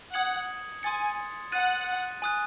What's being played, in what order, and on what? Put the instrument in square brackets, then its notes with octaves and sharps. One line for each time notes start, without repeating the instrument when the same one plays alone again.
[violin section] F#5 [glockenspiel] D#6 G#6 C#7 F#7
[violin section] G#5 [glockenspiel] C6 D#6 A6 C#7
[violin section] F#5 [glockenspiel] F#6 A6 D#7
[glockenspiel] G#5 D#6 F#6